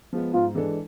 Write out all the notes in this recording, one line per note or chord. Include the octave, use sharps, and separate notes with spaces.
F3 G#3 B3
G#2 F4
E3 G#3 D4 A4